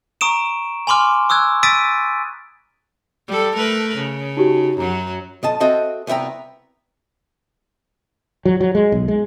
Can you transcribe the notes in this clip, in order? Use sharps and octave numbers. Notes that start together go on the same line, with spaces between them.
A#5 C#6 D#6 D7 E7
G#5 B5 C6 D6 F6
C#6 D#6 E6 F#6 G#6
D#6 E6 A6 B6 D7 D#7
G3 A4
A3 A#4 B4
C#3
D#4 F#4 G4
F#2 F#3 A#5
B1 D#5 A5
C4 F#4 A4 D#5 E5
C2 B3 E5 G5 A#5
F#3
F#3
G#3
B1
G#3